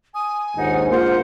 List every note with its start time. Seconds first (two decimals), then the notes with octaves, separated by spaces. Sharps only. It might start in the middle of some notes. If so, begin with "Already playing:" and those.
0.14 G#5 D#6
0.57 A#1 D#2 G#2 D#4 F#5
0.91 A#3 F4 C5 F#5